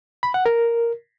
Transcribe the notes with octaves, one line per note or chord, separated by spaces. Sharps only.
B5
F#5
A#4